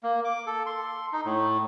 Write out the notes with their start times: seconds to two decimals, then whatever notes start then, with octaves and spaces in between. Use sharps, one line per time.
0.03 A#3
0.24 D6
0.47 A4
0.66 C6
1.13 D#4
1.25 A2